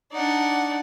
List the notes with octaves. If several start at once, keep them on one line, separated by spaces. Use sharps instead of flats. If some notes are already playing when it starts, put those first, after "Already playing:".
D4 D#4 D5 F#5